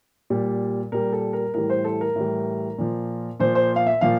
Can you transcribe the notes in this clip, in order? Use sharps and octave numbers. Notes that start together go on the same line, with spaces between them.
A#2 G3
A#2 G3 A#4
A4
A#4
A2 E3 G3 A#4
C5
A4
A#4
A2 E3 G3
A#2 F3
A#2 F3 C5
C5
F5
E5
A#2 F3 F5